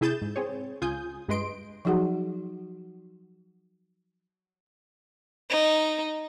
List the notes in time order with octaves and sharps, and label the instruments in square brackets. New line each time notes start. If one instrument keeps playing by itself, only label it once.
[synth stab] C3 E4 G#4 G6 A6 E7
G#2
C4 G#4 C#5
C#2 F4 G#5 D#6 G6
G2 G#3 B4 D#5 C6 D7
[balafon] F3 F#3 D#4 F#4 G#4 F#5
[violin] D#4